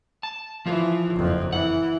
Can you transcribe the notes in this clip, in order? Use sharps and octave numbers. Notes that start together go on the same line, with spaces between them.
A5
E3 F3 F4
F#1 F2
E3 F#5